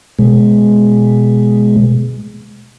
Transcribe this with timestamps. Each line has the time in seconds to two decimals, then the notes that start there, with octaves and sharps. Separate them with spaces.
0.19 B2 G#3